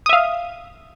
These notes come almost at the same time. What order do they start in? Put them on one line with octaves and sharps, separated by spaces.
D#6 E5 F5